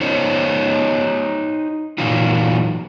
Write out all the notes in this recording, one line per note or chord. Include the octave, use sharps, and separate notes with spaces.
D#4 C5 C#5 D#5
A#2 E3 F#3 D#4 F4